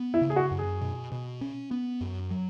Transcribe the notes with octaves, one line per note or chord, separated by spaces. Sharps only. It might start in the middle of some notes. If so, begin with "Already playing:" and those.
Already playing: B3
E4
C#3
G#4
F#4
F#2
G#4
B2
B2
C#4
B3
F#2
F#3